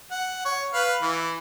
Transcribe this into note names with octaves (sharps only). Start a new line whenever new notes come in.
F#5
C#5
B4 F5
E3